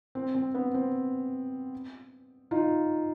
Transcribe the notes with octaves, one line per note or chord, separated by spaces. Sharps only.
C4
C4
B3
C4
D#4 F4